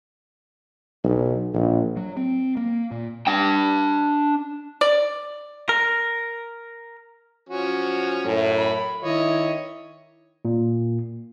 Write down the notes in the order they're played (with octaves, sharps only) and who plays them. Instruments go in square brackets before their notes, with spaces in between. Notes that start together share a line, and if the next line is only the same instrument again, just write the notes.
[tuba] B1
A#1
[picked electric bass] F#3
C4
A#3
A#2
[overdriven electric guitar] D4 G5
[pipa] D5
[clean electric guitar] A#4
[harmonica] F3 C#4 F#4
[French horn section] F#2 A2
[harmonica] B5
[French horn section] D#3 E4 [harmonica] C#5 D#5
[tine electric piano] A#2